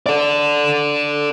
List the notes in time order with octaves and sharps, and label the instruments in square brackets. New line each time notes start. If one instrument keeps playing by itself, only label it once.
[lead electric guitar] A4 D5